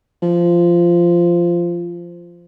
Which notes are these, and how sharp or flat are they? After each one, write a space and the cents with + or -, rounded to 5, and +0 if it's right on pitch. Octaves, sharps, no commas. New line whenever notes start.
F3 -15